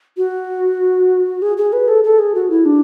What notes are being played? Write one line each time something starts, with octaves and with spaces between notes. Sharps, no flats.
F#4
G#4
G#4
B4
A4
A4
G#4
F#4
E4
D4